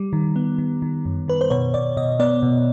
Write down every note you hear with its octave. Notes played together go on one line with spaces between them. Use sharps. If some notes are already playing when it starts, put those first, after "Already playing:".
Already playing: G3
D#3
B3
D#3
D#3
F#2
D#3 B4
C5
B2 C#5
B2 D5
B2 D#5
B3 D5
B2